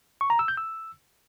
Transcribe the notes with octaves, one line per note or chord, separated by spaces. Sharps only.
C#6
A#5
E6
G6
E6